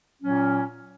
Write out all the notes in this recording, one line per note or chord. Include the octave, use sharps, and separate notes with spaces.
A#2 F#3 C#4